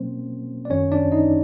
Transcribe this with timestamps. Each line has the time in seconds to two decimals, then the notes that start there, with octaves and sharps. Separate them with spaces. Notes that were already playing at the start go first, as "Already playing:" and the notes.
Already playing: B2 F#3 A#3 C4 C#4 C5
0.65 D5
0.70 G#1 F#2 D#3 C#4 C#5
0.92 D4 D5
1.12 D#4 D#5